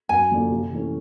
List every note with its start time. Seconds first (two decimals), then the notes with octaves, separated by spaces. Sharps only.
0.09 F#2 G#5
0.30 D3 F3 A#3
0.51 C3
0.71 E3 A3 C#4